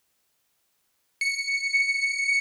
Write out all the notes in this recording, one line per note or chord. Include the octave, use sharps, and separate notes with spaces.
C#7